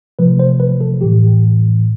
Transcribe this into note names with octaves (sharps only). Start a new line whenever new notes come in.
C3 F3 A3 B4
C5
B4
A4
A2 E3 G3 G4